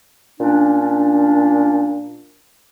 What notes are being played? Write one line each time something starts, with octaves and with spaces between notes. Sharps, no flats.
A#2 C#4 D4